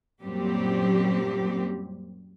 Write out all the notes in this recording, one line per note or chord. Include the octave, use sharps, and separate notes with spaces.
F#2 A#2 F#3 G3 C4 G4